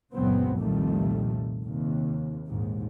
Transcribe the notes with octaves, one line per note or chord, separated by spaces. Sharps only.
F#1 C#2 A#2 F#3 B3 C4
C2 F2 A#2 D#3 G3 A3
D#2 C3
A#1 D#2 G#2